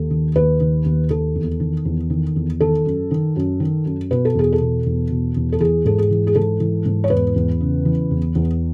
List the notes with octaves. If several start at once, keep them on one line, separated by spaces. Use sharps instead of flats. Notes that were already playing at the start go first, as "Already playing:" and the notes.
Already playing: D#2 A4
D#3
D#2 B4
D#3
D#2
D#3 A4
E2
D#3
E2
D#3
E2
D#3 A4
F#2
D#3
F#2
D#3
F#2
B2 B4
A4
E2 G#4
A4
B2
E2
B2
E2
A4
E3 G#4
G#2 A4
G#4
E3
G#4
G#2 A4
E3
G#2
C#5
E2 B4
E2
C#3
E3
E2
E2